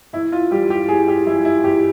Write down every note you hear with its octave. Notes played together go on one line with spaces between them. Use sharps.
E2 E4
F4
E3 G3 G4
G4
E2 G#4
G4
E3 G3 E4
E4
E2 G4